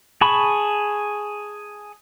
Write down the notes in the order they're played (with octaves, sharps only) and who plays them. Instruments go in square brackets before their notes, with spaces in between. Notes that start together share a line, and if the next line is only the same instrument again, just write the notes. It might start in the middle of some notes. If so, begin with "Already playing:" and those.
[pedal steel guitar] G#4 A5 B5 C#6